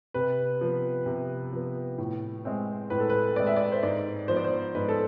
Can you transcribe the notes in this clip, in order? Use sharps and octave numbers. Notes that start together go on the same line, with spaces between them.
C3 B4
F3 B3
C3
F3 B3
A2
G#3 C4
A2 B4
A4
B4
G#3 C4 D5
E5
D5
C5
G#2 D5
F3 B3 C5
D5
C5
G#2 B4
A4